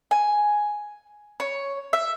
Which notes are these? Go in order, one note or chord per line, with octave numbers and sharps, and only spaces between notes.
G#5
C#5
E5